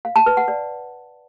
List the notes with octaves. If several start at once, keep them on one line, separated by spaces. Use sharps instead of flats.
F5
A5
B4
F#5
D5